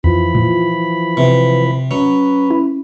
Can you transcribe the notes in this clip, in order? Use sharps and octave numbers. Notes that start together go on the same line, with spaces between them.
F2 E3 F3 F4 B5
A#2
C3 B4
F#3 C#4 B4
E4